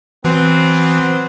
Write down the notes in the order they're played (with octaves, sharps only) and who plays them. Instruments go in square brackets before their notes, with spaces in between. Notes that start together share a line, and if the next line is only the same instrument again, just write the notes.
[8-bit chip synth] E3 [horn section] F#3 B3 C4